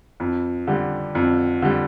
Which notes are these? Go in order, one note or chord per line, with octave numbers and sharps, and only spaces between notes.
F2
D3 G3
F2
D3 G3